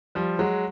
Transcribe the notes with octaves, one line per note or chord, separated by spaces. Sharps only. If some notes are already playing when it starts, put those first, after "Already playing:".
F3 G3
F#3 G#3